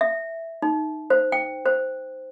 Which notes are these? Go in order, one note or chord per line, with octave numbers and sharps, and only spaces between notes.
E5
D#4
C5
G5
C5